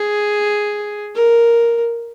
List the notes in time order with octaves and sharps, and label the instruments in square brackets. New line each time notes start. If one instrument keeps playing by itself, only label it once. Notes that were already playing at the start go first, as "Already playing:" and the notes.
Already playing: [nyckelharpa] G#4
A#4